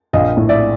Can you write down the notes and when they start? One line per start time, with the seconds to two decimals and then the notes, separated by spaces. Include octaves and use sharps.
0.13 A#1 D#5 F5
0.37 A2
0.49 D5 E5